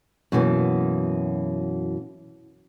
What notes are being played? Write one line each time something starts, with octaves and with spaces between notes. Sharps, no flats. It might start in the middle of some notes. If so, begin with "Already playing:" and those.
F#2 B2 E3 A#3